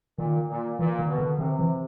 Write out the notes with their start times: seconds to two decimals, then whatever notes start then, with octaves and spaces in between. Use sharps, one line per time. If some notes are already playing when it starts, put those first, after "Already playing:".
0.18 A#2 D#3
0.49 A#2
0.79 A#2 E3
0.99 D#3
1.09 B2
1.18 D3
1.39 C3 D#3
1.59 E3